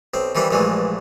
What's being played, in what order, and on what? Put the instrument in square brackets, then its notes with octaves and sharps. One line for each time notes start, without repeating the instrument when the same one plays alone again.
[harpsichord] B1 C4
D#3 E3 G3 C4 E4
A#1 G2 E3 G#3 A3